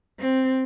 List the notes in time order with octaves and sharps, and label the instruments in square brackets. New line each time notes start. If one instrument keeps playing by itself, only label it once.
[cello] C4